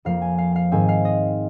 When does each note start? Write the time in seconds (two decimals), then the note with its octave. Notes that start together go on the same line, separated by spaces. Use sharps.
0.05 F2 F3 A#3 F5
0.22 G#5
0.38 F5
0.56 F5
0.72 G#2 D#3 C4 G#5
0.89 F5
1.05 D#5